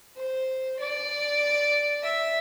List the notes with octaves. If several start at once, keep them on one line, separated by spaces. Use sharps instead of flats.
C5
D5
E5